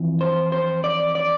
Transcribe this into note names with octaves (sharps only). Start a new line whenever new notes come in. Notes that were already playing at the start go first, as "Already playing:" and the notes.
Already playing: F2 E3
C5
C5
D5
D5